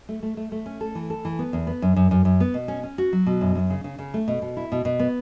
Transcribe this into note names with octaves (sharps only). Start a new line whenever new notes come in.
A3
A3
A3
A3
C#4
A4
E3
A4
E3
B3
E2
B3
F#2
F#2
F#2
F#2
B3
B2
C#4
C#4
F#4
F#3
B2
F#2
F#2
C#3
C#3
C#3
A3
B2
B2
E4
B2
B2
B3